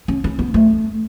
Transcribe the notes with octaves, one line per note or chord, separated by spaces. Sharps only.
C#4
C#4
B3
A3